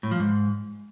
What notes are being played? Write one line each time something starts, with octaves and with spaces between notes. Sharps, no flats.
A2
F3
G#2